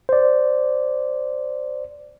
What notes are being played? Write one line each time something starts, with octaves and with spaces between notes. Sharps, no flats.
C5 D5